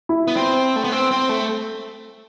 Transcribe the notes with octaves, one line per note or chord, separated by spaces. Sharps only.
E4
B3
C4
A3
B3
C4
C4
A3